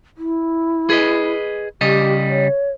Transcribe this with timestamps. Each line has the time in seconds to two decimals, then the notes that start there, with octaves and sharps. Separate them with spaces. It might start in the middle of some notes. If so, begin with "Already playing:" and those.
0.18 E4
0.90 G#4 B4 D#5
1.81 C#3 G3 G4 D#5
2.29 C#5